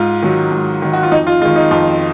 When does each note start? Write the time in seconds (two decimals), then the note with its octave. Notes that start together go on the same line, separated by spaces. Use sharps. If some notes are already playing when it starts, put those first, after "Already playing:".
Already playing: G#2 F4
0.22 D#3 F#3
0.52 G#2
0.82 D#3 F#3
0.93 F#4
1.03 F4
1.12 F2 D#4
1.27 F4
1.41 G#3 F4
1.45 D#3
1.56 D#4
1.71 F2 F4